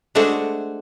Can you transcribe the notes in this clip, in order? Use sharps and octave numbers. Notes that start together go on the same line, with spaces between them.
G#3 A3 D4 F#4 C5